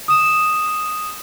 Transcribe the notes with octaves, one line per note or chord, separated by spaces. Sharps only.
D#6 E7